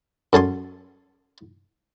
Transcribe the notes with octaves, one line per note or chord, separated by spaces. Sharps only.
F#2 A4 G#5 C6